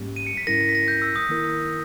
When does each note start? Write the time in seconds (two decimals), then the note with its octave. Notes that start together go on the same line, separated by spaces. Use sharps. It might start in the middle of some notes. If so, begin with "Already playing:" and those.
Already playing: G#2 G3 A#3 C#4 G4
0.16 D#7
0.27 C#7
0.37 B6
0.47 G#2 G3 C#4 E4 A#4 A#6
0.61 A#6
0.69 B6
0.75 A#6
0.88 G6
1.02 E6
1.16 D#6
1.29 D#3 A#3 E4 A#4